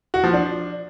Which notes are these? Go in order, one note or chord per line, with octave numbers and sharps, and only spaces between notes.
F#4
F3
D4